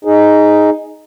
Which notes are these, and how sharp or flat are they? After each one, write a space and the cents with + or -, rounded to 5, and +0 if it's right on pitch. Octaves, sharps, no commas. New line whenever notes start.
D#4 +0 G#4 +0